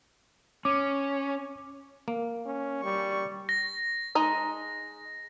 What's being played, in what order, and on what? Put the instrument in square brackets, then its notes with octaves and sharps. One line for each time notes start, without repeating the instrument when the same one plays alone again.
[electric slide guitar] C#4 [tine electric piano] D6
[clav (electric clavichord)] A#3
[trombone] C#4
[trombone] G3 [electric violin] C#6
[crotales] A#6
[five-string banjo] G#3 D#4 D#5